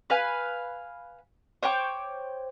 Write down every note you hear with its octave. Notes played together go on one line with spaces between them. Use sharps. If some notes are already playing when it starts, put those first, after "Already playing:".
B4 F5 G#5
C5 C#5 G5 D6